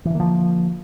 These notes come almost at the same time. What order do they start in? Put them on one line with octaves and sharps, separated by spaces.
E3 D3 A#3 F3